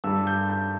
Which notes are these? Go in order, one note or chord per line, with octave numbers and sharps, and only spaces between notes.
G2 G3 E6
G6
G6